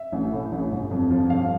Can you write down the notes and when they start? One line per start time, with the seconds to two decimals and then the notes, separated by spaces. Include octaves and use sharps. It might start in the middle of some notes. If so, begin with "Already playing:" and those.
Already playing: E5
0.12 A1
0.32 A2
0.52 A1
0.71 G1
0.91 F2
1.11 F3
1.30 G1 F5